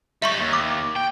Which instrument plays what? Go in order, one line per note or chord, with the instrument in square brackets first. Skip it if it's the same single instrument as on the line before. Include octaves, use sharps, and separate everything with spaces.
[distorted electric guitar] G3 D#4 [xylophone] E5 C6 C#6
[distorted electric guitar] D#2
[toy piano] D6
[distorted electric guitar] G5